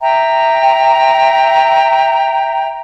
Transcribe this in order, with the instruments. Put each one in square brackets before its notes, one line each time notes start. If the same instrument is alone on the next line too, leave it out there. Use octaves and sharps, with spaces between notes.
[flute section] E5 G5 A#5